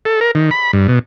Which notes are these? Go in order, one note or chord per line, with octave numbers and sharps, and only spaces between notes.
A4
A#4
D#3
B5
G2
B2